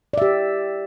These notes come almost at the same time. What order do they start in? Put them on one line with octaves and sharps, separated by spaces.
D5 E5 G4